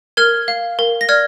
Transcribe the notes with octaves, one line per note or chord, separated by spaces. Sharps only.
A#4 F6 G#6
F5
A#4
A#6
D5 F6 G#6